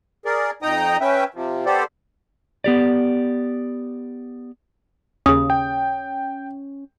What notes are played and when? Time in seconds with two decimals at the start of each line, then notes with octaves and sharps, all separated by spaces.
0.25 G#4 A#4 D5
0.62 F2 D#4 D#5 G5 A#5 D#6
1.01 C#4 B4 E5 G5
1.34 C3 F3
1.66 B3 G4 A4 C5 D5
2.64 B3 G4 D5
5.26 D#2 C#3 C#4 D#6
5.50 G5